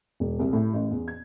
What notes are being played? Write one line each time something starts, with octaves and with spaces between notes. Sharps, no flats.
E1
C2
A2
A1
E2
G#6